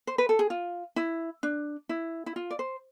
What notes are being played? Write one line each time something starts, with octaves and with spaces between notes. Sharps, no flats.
C5
B4
A4
G#4
F4
E4
D4
E4
E4
F4
D5
C5